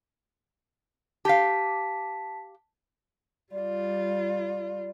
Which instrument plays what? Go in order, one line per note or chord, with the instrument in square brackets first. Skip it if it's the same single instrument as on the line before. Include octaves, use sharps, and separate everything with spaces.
[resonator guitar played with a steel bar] G4 F5 [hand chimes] A5 B6
[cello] G3 F4 [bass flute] D5